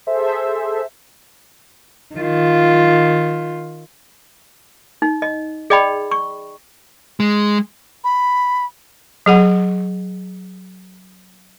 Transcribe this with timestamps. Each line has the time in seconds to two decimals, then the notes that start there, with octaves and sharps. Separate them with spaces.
0.07 G#4 A4 C5 E5
2.15 D#3 F4
5.02 D#4
5.22 D#5
5.70 G#4 D5 D#5 G5 B5
6.11 C#6
7.20 G#3
8.04 B5
9.26 F#3 G#4 F#5